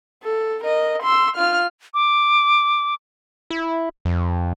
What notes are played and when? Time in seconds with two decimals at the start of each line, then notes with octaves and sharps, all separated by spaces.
0.24 A4
0.64 A#4 D#5
1.03 C6 E6
1.36 F4 F6
1.94 D6
3.50 E4
4.05 F2